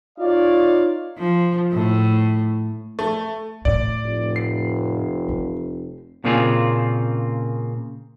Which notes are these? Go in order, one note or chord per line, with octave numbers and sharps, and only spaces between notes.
D#4 F4 C#5 D5 F5
F3
A2
A3
A2 D5
F1
C7
C4
A#2 C#3 A#3 C4 F4 G#4